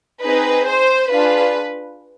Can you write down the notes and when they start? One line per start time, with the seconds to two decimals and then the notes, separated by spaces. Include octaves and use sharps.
0.23 C4 D#4 G#4 B4
0.67 C5
1.12 D4 F4 G#4 B4